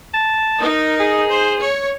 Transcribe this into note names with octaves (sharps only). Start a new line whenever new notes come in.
A5
D#4 A#4
G#4
C5
C#5